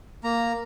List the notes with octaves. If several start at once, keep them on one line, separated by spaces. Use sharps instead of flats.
A#3 A#5